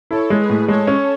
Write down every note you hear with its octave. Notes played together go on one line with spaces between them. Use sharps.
E4 A4 C#5
G#3
G#4 B4
A2
G#3 A4 C#5
C#4